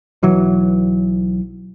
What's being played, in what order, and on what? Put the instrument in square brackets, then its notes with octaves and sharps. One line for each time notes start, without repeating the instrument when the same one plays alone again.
[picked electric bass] B1 E3 F#3